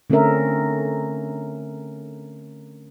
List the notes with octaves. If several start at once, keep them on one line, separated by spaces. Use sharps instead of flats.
D3 A3 C4 C#4 A#4 E5